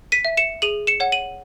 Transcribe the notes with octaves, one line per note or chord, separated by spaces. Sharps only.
B6 D#7
E5
C#7 E7
G#4 D#7 F#7
C#7 E7
C#5 F#5
D#7 F#7